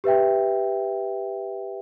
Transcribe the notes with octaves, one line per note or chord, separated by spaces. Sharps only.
G4 B4 E5 G5